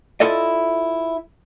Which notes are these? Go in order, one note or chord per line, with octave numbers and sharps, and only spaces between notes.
E4 F4 A4 D5 D#5